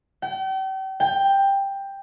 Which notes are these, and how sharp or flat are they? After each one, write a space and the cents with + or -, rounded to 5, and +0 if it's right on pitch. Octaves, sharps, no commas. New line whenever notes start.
G5 -40
G5 +10